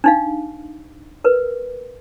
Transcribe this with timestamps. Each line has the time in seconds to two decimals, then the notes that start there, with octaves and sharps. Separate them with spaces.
0.04 D4 D#4 F5
1.24 A#4 B4